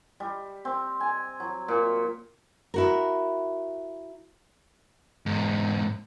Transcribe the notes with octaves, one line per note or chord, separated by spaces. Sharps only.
G3
C4
G#5
F#3
A#2
E4 F#4 A#4
E2 G#2